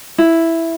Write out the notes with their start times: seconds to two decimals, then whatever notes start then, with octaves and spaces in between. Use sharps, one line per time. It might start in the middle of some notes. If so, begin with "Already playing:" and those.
0.18 E4